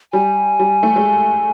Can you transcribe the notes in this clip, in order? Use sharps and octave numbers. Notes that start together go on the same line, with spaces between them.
G3 G#5
G3
A3
G#3